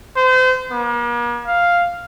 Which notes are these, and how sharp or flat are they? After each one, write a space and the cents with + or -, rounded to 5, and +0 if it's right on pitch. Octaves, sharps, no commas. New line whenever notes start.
C5 -35
A#3 +45
F5 +0